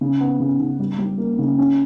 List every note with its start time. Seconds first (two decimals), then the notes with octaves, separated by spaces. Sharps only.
0.01 C#3
0.20 B3
0.40 C#3
0.60 C#3
0.79 G3
0.98 G3
1.18 A#3
1.39 C#3
1.58 C#4